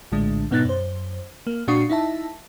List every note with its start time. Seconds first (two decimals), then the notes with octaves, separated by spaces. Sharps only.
0.12 A#1 A2 D3 G#3 D4
0.51 G#2 B2 B3 D#4 F#6 A6
0.65 F#2 C5
1.47 A#3
1.68 A#2 D4 F#4 C#6 D#6 C7
1.90 D#4 E4 E5 A5